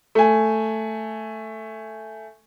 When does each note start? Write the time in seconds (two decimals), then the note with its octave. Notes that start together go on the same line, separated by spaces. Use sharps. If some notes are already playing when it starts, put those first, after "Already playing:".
0.15 A3 G#5